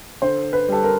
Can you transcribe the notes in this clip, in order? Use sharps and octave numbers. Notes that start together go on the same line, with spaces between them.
D3 C5
B4
G3 A4
A#4